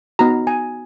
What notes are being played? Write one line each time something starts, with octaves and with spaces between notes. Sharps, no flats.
B3 D#4 F#4 A#5
G#5